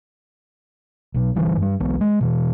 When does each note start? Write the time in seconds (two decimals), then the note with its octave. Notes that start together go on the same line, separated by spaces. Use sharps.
1.14 B1 B2
1.35 G1 D3 E3 G3
1.58 G2 G3
1.80 B1 E3 G#3 B3
2.01 G#3
2.21 B2 E3